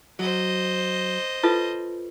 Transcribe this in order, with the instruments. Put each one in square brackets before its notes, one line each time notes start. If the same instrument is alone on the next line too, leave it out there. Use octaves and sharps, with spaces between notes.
[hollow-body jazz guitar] F#3 [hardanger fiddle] C5 D#5
[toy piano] F4 A4 B4 [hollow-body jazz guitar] A5